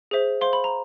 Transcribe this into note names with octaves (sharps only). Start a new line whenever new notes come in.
G#4 C5 E5
C5 F5 C6
B5
A#5